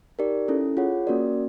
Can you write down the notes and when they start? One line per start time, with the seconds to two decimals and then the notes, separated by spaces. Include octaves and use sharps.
0.19 D#4 G4 A#4 D5
0.48 C#4 E4 A4
0.77 F4 G#4 C#5 F#5
1.07 A#3 C#4 F#4 A#4 D5